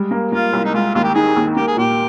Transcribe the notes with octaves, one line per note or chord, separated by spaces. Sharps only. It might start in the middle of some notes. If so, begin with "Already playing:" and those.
Already playing: G3 G#3
A#3
A#3 F4
C2
D#4
G#3 F4
D#2 F4
G4
D#4 G#4
D#2
A#3 G4
G#4
A#2 G4